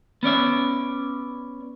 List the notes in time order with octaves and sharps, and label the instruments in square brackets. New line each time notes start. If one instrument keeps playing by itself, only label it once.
[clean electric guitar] B3 C#4 D5 E5